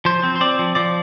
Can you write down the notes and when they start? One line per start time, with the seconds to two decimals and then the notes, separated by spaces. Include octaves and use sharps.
0.05 F3 C5
0.24 C4
0.36 C5
0.41 C4 D5
0.59 F3
0.75 F3 D5